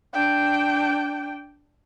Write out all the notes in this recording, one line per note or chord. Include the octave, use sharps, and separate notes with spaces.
D4 G5